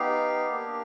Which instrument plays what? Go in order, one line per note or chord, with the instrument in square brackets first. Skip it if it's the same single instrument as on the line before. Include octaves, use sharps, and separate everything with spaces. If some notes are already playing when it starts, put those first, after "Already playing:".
Already playing: [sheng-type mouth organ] B3 D#4 G4 F5
A#3 D4 G4